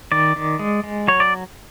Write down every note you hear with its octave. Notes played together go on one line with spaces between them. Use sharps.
D#3 D5
D#3
G#3
G#3
F#3 C#5
D5